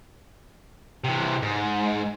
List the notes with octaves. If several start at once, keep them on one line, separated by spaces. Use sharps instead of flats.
C3 E3
G#2